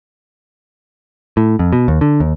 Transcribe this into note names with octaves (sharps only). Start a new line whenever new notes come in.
A2
F2
B2
D#2
D3
D#2